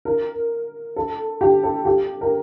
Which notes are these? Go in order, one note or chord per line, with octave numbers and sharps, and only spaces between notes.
A#4
A4
G4
A4
G4
A#4